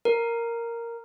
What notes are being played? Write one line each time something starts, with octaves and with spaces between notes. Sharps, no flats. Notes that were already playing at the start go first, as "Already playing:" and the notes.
A#4